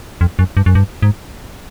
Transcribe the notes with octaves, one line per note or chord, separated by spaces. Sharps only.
F2
F#2
G2
F#2
G2
G#2